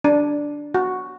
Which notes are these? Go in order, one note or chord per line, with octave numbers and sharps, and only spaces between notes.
D4
F#4